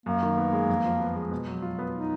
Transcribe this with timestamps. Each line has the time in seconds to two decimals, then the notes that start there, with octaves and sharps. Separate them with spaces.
0.06 F#2 A#3
0.23 D#3
0.37 B3
0.53 G#3
0.69 F2
0.85 F3
1.00 B3
1.16 G#3
1.32 B2
1.48 F#3
1.62 F4
1.79 B3
1.95 D#4